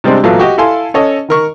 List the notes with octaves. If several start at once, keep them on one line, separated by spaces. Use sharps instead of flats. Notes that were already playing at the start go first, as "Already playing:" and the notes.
C3 G3 G#3 C4 D4
A1 A#2 F#3 B3 A4 F5
F#4 G4 D#5
E4 A4 F5 G#5 C6
C#4 A4 C#5 D#5
D#3 A#4 C#6